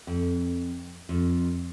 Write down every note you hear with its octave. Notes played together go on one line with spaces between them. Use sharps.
F2
F2